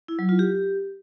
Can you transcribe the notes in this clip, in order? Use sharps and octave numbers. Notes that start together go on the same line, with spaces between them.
E4
F#3
F4
G4